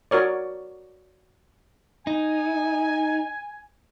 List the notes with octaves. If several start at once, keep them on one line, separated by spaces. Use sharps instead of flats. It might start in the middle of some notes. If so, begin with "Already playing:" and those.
F#4 A#4 C#5 D5
D#4 G#5